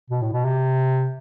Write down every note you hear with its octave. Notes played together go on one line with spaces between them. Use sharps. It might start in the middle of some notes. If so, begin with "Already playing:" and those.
B2
A2
B2
C3